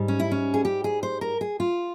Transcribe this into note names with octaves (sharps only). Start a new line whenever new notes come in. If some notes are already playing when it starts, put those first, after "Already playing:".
Already playing: G#2 G3
C#4
E4
C#4
G#4
G4
G#4
C5
A#4
G#4
F4